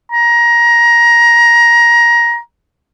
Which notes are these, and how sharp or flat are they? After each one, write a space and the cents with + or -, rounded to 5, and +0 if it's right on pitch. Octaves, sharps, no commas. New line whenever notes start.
A#5 +20